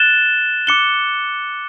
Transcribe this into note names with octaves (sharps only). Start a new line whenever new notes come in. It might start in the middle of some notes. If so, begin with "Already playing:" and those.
Already playing: F#6 A6 E7 G7
D6 F#6 C#7 G7